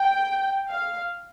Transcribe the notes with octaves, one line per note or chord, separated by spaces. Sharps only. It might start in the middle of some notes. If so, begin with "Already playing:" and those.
Already playing: G5
F5